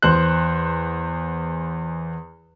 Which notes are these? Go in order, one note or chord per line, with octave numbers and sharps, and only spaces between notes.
E2 C5 F#6